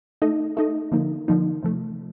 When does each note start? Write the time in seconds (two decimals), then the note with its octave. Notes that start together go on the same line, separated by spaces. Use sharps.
0.22 A3 D#4 A4 D#5
0.57 A3 D#4 A4 D#5
0.92 D3 F3 A#3 D#4
1.28 D3 F3 A#3 D#4
1.63 C3 F3 A3